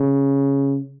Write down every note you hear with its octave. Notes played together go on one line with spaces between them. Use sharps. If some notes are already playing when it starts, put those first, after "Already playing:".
Already playing: C#3